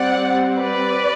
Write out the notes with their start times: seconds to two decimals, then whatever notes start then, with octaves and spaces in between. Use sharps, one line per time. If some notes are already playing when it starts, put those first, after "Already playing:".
Already playing: G3 C4 D5 F#5
0.58 B4 D5